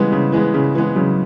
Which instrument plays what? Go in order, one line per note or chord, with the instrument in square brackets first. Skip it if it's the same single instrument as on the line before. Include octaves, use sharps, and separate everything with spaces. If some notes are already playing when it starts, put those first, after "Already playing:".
Already playing: [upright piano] C#3 E3 G#3 B3 [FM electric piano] G3
[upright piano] C#3
E3 G#3 B3
C#3
E3 G#3 B3
[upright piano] C#3 [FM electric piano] F#3